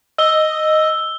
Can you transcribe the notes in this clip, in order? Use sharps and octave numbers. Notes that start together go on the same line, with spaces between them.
D#5 E6 G7